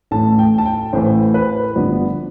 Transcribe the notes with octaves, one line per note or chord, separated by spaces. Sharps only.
A1 A2 E3 A5
G5
A5
G5
A1 A2 E3 C5
B4
G1 G2 F3 B3 D5